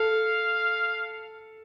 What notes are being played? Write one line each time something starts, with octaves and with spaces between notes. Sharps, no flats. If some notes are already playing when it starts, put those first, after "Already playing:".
Already playing: A4 F5